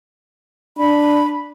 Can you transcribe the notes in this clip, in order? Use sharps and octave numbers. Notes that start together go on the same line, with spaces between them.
D4 B5